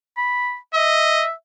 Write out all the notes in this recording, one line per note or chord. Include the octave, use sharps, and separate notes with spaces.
B5
D#5 E5